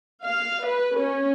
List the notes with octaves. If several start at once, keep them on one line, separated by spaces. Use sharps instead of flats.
F5
B4
C#4